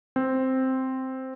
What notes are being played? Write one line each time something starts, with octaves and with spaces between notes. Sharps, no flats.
C4